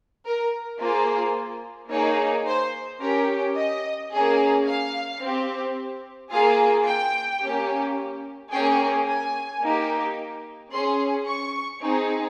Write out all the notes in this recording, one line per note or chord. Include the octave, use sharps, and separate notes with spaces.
A#4
A#3 F4 G#4 C5
A#3 D#4 G#4 C#5
C5
C#4 G4 A#4
D#5
A#3 C#4 G#4
F5
C4 G4
A#3 F4 G#4 F5
G5
A#3 C#4 G4
A#3 C#4 G#4 G5
G#5
A#3 D#4 G4
C#4 G#4 C6
C#6
C4 D#4 G#4